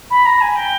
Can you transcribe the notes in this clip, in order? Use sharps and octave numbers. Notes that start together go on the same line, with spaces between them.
B5
A#5
G#5
G5